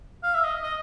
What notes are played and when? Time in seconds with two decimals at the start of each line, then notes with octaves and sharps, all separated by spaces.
0.23 F5
0.34 E5
0.44 D#5
0.63 D#5